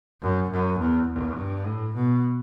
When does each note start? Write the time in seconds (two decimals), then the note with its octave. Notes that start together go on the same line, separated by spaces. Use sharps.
0.22 F#2
0.50 F#2
0.79 E2
1.08 E2
1.38 G2
1.66 A2
1.95 B2